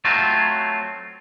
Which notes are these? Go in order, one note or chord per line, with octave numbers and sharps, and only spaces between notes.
F#3 A3 C4 F4